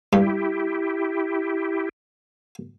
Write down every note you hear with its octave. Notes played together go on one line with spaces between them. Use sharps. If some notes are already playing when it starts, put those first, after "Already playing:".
G2 E4 G4